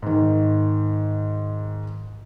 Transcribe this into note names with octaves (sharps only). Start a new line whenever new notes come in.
G#2 D#3